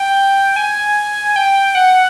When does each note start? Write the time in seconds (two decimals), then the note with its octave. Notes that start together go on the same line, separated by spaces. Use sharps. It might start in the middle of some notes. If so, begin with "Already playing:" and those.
Already playing: G5
0.56 G#5
1.36 G5
1.75 F#5